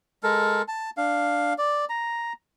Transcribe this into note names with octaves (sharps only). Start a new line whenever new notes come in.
G#3 A4 A#4
A5
D4 F5
D5
A#5